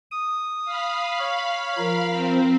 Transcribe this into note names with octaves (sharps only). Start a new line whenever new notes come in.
D#6
F5 B5
C#5
F3 A#4
C4